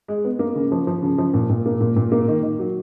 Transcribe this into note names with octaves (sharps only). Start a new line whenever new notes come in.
G#3
B3
A#3
C#3
F3
F3
C#3
F3
A#2
A#2
A#3
A#2
A#2
A#3
D#3
D#3
F#3